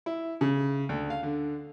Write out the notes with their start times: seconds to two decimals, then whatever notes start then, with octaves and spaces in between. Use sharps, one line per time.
0.06 E4
0.41 C#3
0.89 D2
1.10 F5
1.23 D3